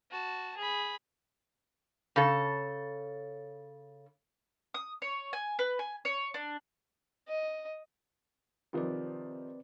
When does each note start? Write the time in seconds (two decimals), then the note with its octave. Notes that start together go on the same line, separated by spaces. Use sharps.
0.11 F#4 A5
0.57 G#4 B5
2.16 C#3 A4
4.74 D#6
5.02 C#5
5.33 G#5
5.59 B4
5.79 G#5
6.05 C#5
6.34 D4
7.28 D#5
8.73 C3 D#3 F3 C4 B4 D5